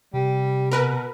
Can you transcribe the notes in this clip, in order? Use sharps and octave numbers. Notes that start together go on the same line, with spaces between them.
C3 G3
B2 A#4 B4